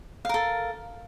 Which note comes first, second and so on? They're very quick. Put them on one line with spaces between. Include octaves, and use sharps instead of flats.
F5 A#4 A4